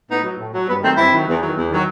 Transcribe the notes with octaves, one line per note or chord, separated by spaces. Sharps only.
A2 B3 D#4
F#3
A2
F#3
G2 B3
D#3 F#3 A3 C4
G2 C4 E4
D#3 F#3
E2
D#3 F#3
E2
D#3 F#3